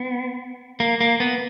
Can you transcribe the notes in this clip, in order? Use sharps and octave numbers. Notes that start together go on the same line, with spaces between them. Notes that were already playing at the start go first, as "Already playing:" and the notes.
Already playing: B3
A#3
A#3
B3